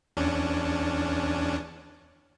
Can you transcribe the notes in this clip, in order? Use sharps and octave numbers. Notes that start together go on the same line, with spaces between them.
E2 C#4 D4